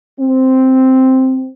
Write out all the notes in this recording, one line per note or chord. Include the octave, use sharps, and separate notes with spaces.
C4